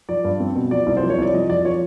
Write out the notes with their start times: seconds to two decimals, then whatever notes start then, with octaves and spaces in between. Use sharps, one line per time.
0.09 F3 D5
0.24 G2
0.40 C4
0.56 B2
0.71 F3 D5
0.87 C2
0.97 C5
1.03 F3
1.10 C#5
1.18 C2 D5
1.34 F3 D#5
1.49 F2 D5
1.65 F3 C#5